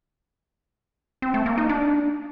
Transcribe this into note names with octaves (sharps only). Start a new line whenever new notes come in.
C4
A3
A#3
D#4
D4